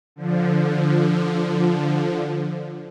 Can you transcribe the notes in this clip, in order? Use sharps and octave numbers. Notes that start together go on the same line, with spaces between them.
D3 F3